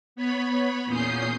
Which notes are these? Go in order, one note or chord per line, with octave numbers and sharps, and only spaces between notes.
B3 C#5 B5
E2 A#2 C#4 D#6 G6 C7